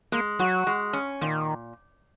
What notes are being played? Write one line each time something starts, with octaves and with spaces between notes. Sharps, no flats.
G#3 A#3
F#3 F#4
G#3
C#4
A#2 D#3